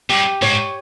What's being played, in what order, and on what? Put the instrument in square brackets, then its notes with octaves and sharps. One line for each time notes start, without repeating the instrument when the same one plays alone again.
[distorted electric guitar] G2 [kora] G4
[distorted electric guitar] G#2 [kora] C#5